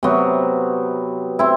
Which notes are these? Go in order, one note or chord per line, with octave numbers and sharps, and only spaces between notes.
C3 F#3 B3
C4 E4